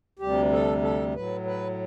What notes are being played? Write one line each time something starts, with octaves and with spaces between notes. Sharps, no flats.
D2 C3 G3 G4
A4
A4
A2 F#3 B4
B4